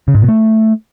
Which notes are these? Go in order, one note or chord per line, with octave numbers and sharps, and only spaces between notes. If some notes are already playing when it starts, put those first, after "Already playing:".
C#3
G#2
B2
A3